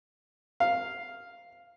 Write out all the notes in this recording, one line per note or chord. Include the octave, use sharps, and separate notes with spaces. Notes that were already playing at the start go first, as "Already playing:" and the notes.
F5